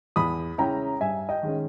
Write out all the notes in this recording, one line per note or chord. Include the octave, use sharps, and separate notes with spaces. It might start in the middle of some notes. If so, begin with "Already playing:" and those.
E2 B5 D#6
C#3 G#3 C#4 E4 G5 A#5
G2 E5 G#5
D#5 G5
D#3 G#3 C#4